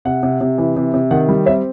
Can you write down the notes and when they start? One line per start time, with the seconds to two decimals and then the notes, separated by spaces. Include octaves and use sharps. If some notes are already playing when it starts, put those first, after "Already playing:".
0.05 C3 F#5
0.23 C3
0.41 C3
0.58 E3
0.76 C3
0.94 C3
1.11 D#3 F#5
1.29 G3
1.46 C4 E5